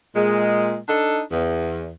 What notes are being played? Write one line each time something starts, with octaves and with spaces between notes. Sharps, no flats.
A#2 G#3
D4 D#4 A4
E2